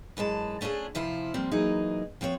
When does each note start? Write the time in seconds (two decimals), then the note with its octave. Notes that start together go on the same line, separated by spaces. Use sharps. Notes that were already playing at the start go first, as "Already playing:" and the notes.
0.17 F#2 E3 G#3 A5
0.61 A3 C#4 D4 F4 G#4
0.95 C3 F3 E4 F4
1.34 F3 G3 A#3 C4
1.51 E3 F#3 A#3 D#4 G#4
2.21 F3 C4 F#4 C#5